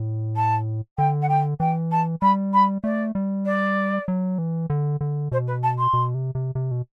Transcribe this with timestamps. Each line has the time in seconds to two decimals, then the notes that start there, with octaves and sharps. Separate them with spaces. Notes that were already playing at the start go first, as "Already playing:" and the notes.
Already playing: A2
0.36 A5
0.98 D3 G5
1.22 F#5
1.29 G5
1.60 E3 G5
1.91 A5
2.22 G3 B5
2.53 B5
2.84 A3 D5
3.15 G3
3.45 D5
4.08 F#3
4.38 E3
4.70 D3
5.01 D3
5.32 B2 C5
5.47 B4
5.63 A5
5.78 C6
5.93 B2
6.14 C3
6.35 C3
6.55 C3
6.71 B2